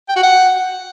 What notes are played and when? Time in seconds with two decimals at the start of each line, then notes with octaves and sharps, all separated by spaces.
0.09 G5
0.16 F#4
0.24 F#5